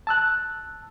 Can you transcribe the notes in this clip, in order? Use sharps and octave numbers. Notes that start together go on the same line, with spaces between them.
A5 E6 F#6